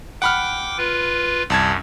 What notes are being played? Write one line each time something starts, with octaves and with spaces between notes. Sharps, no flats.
F#5 G5 B5 D6 F6
F4 B4
C2 F#2 A5 G#6